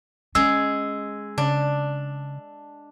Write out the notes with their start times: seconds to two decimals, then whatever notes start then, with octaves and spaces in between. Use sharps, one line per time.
0.35 G#3 C#4 E6
1.38 C#3 D4